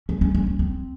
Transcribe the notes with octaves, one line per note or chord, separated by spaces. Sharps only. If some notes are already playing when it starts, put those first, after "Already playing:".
C#4
C#4
C#4
C#4
C4